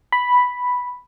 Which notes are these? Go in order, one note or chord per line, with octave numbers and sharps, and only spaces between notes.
B5